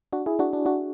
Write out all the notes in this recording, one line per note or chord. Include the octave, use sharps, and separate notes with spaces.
D4 F#4
E4 G#4
D4 F#4
D4
D4 F#4